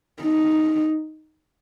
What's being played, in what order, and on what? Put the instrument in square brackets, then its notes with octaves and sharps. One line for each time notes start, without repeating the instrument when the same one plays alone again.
[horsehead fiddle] D#4